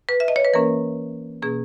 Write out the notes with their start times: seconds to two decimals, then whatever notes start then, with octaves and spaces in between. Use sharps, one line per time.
0.09 B4
0.20 E5
0.28 D#5
0.36 C#5
0.45 B4
0.53 E3 A#3 C#4 A#4
1.42 B2 A#3 C#4 G#4